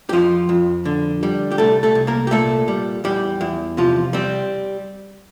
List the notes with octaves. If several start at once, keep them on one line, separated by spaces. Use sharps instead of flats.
G4
F2 F3 F4
F2
D3
G3
G4
C2 A3 A4
A3 A4
C2
A#3 A#4
G4
A#2 A3 A4
G3
E2 G3 G4
E2
C3 F3 F4
G3 C4